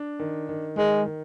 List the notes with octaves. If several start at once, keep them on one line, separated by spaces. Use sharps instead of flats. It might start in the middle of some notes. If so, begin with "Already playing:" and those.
Already playing: D4
D#3
D#3
D#3 G#3
D#3